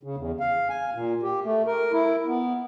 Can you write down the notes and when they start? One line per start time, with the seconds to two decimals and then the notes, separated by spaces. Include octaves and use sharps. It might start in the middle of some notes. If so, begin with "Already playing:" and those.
0.03 C#3
0.17 E2
0.40 F5
0.69 G#5
0.95 A#2
1.22 G4
1.45 A3
1.67 A#4
1.92 E4
2.27 B3